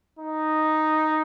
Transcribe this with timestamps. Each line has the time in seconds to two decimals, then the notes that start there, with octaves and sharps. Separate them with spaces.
0.19 D#4